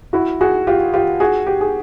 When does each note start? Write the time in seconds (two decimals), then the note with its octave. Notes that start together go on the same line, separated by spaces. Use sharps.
0.13 E4 F#4
0.41 F#4 G#4
0.67 F4 G4
0.94 F4 G4
1.20 F#4 G#4
1.47 G4
1.61 G#4